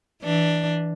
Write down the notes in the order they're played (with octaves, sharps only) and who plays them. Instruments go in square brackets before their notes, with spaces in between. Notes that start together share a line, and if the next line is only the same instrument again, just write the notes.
[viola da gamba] E3 D4